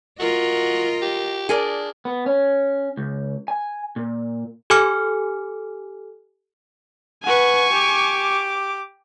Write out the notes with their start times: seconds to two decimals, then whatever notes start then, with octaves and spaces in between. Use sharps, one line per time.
0.19 F4 F#4 A#4 D#5
1.02 G4
1.49 D4 G#4 A#4 D5
2.05 B3
2.26 C#4
2.97 C#2
3.48 G#5
3.96 A#2
4.70 G4 A4 G#5 D6 F6 C#7
7.24 B4 F#5 G#5 C#6
7.72 G4 D6